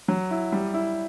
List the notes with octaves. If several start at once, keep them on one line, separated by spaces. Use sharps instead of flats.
F#3
E4
G3
E4